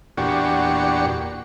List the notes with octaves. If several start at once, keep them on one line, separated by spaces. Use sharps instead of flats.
E2 A#2 D4 F#4 G4 C#6